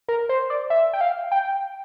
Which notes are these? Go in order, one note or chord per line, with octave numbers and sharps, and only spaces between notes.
A#4
C5
D5
E5
G5
F5
G5